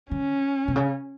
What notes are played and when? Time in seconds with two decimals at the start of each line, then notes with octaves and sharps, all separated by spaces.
0.11 D3 C#4
0.68 B2
0.76 C#3